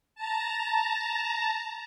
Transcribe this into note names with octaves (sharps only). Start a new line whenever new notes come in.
A5 A#5